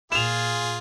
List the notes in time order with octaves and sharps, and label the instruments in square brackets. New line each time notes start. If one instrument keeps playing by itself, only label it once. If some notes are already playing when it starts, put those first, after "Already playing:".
[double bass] A#2 [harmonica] F4 G#4 [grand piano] E7 F7